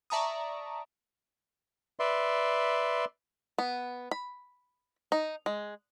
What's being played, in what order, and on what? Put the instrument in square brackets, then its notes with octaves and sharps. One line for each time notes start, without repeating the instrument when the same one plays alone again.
[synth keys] D5 E5 A5 A#5 C#6 D#6
[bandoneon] B4 D5 E5 C6
[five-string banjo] B3
B5
D#4
G#3